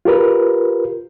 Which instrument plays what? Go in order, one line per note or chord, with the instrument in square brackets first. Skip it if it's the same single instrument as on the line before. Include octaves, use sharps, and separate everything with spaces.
[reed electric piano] F4 G4 A#4 B4